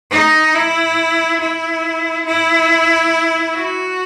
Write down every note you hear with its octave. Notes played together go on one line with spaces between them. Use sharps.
D#4
E4
E4
E4
F#4